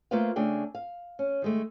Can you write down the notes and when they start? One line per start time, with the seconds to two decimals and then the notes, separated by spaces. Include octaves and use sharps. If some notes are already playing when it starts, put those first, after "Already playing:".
0.11 A3 A#3 F4 B4 C5 F5
0.36 C#3 A3 D4 G#4 G5
0.75 F5
1.19 C#4
1.42 D#3 G#3 A3